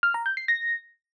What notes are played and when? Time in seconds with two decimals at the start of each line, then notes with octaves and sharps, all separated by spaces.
0.03 F6
0.14 A#5
0.26 G6
0.37 C7
0.48 A#6